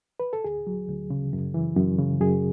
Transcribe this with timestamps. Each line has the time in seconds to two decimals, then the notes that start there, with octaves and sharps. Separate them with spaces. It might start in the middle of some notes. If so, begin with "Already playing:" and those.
0.20 B4
0.33 A4
0.44 D2 G#4
0.67 F#3
0.88 D2
1.10 C#3
1.33 F#2
1.54 E3
1.76 F#2
1.98 C#3
2.21 F#2 G#4